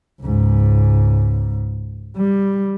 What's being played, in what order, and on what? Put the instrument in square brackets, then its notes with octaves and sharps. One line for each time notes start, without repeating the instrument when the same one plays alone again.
[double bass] C#2 G#2
G3